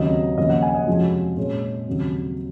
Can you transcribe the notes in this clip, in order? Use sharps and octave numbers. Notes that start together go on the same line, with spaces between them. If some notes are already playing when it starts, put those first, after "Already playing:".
Already playing: D#2 C#3 F#3 C4 D#5
D#2 C#3 F3 A#3 D#5
F#5
G#5
D#5
F2 C3 F3 G#3 C#4 F#4
A#2 G#3 C#4
D#2 C#3 F#3 C4